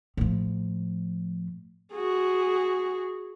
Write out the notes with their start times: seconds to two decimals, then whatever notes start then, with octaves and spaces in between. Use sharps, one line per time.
0.17 A2 F3
1.93 F#4 G#4